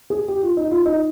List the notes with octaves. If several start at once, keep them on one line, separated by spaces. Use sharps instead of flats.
G#4
G4
F4
D#4
F4
D#4